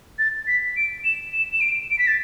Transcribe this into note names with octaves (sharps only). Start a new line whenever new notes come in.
A6
B6
D7
E7
E7
E7
D7
D7
B6
A6